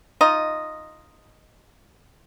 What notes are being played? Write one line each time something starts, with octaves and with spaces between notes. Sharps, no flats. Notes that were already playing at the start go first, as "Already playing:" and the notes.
D#4 F4 D#5